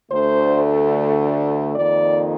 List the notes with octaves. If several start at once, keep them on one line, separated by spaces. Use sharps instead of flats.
D2 D3 A3 C5
F2 D#3 A#3 D5